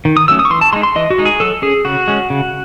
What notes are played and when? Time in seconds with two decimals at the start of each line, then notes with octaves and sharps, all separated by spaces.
0.05 D#3
0.17 D#6
0.28 F#3 A3 C#4 E6
0.39 D#6
0.45 C#6
0.50 E3 C6
0.61 A5
0.73 G#3 D#4 C6
0.83 C6
0.96 E3 D#5
1.10 F#4
1.18 G#3 D#4
1.25 G#4
1.40 F#3 A4
1.62 C#4 G#4
1.85 C#3 F#4
2.08 G#3 C#4
2.30 C#3